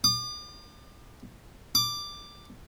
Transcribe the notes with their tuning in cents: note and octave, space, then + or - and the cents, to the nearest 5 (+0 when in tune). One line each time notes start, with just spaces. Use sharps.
D6 +35
D6 +10